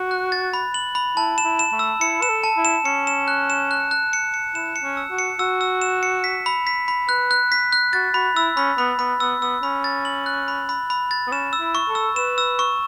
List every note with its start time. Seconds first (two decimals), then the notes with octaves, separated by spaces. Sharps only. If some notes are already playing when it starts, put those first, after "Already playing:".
Already playing: F#4
0.11 F#6
0.32 A6
0.53 B5
0.74 F#7
0.95 B5
1.17 E4 A5
1.38 E7
1.45 E4
1.59 E7
1.72 A3
1.79 E6
2.01 E4 C#7
2.22 B4 E7
2.29 A4
2.44 A5
2.57 E4
2.65 E7
2.85 C#4 C#7
3.07 E7
3.28 F#6
3.50 E7
3.71 F#6
3.91 F#6
4.13 C#7
4.34 C#7
4.55 E4 E7
4.76 C#7
4.83 C#4
4.97 E6
5.11 F#4
5.19 C#7
5.39 F#4 E6
5.61 E6
5.82 E7
6.03 C#7
6.24 B6
6.46 B5
6.67 B6
6.88 B5
7.09 B4 F#6
7.31 F#6
7.52 B6
7.73 F#6
7.93 F#4 A6
8.14 F#4 B5
8.36 E4 E6
8.57 C#4 B5
8.78 B3 B5
8.99 B3 B5
9.20 B3 E6
9.42 B3 E6
9.63 C#4 B5
9.84 A6
10.05 F#7
10.26 F#6
10.48 B5
10.69 B5
10.90 B5
11.11 A6
11.27 B3
11.32 C#4 E7
11.53 E6
11.60 E4
11.75 C#6
11.89 A4
11.95 E6
12.16 B4 E7
12.38 E6
12.59 C#6